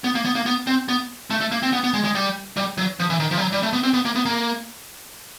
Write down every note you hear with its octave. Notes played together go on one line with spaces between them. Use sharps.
B3
A#3
B3
A#3
B3
C4
B3
A3
A3
A#3
C4
B3
B3
G#3
G#3
G3
G3
F#3
F3
E3
D#3
F3
G3
F#3
G3
A3
B3
C4
B3
A#3
B3
A#3